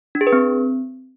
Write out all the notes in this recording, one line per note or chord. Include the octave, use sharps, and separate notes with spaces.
D4
G#4
B4
C4